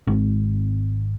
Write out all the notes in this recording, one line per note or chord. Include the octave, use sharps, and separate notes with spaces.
G#1